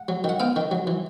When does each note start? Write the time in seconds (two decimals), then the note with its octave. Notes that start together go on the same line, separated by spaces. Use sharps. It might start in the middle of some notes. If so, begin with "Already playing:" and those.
Already playing: F#5
0.08 F#3
0.24 D#3 F#5
0.40 B3 F5 G5
0.56 D#3
0.71 F#3
0.87 E3